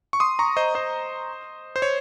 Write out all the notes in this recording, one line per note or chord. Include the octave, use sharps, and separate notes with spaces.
C#6
C6 D#6
A#5 C#6
C5 D#5
C5 D#5
C5
C#5